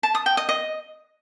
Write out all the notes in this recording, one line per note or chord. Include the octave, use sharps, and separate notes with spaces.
A5
D#6
G5
D#5
D#5